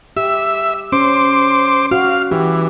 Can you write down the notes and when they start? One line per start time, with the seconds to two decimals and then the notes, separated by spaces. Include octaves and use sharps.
0.17 G4 E5
0.92 C#4 C5 D6
1.91 F#4 F5
2.31 E3 G4